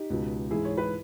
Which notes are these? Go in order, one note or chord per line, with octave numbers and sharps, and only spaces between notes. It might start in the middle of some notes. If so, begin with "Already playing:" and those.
Already playing: D#4 G4
C#2 B2
G#2 E3 E4 G#4
C#5
B4